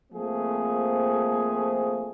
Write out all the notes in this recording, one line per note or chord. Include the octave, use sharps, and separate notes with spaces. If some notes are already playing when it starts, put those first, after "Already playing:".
F3 A3 A#3 C4 G#4